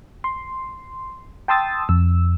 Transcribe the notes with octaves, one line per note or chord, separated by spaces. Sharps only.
C6
G5 A5 C6 D#6 E6 A6
F2 E6